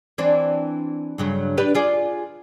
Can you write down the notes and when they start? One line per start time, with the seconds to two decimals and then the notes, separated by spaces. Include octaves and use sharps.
0.18 E3 C4 D4
1.18 G2 C#3 F#3
1.57 D4 G4 B4
1.75 F4 G#4 D5